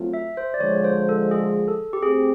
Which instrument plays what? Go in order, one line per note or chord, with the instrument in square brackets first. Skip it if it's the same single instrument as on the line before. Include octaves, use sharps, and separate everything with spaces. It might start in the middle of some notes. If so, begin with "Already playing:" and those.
Already playing: [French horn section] F#3 A3 C4 F4
[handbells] E5
C5
D5
[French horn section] D3 F3 G#3 [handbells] C#5
[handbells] C5
A4
G#4
A4
G4
[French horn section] A3 C4 [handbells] G#4